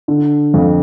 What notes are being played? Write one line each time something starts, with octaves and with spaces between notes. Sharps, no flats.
D3
F2